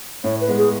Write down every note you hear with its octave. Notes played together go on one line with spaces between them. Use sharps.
A2 C#5
B4
G#3 B3
G#4